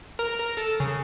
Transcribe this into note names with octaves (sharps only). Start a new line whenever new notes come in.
A#4
A#4
A4
C#3